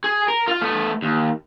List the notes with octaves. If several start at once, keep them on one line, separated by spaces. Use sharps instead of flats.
G#4
A#4
F4 F5
A3 B3
D#2